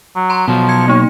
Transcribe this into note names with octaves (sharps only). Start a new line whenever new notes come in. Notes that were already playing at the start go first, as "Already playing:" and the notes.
F#3
A#5 C6
B2 F3 F#3
G#6 C#7
A#3 D#4 C#5